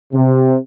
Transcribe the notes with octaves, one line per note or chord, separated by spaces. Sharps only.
C3